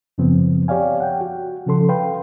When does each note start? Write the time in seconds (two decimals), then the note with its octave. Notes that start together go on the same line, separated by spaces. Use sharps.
0.18 F#2 C#3 F3 B3 C4
0.68 G4 C#5 D5 F5 G#5
1.00 F#5 G5
1.21 F#4
1.66 C#3 F3 C#4 A4 C6
1.89 B4 F5 G5 C6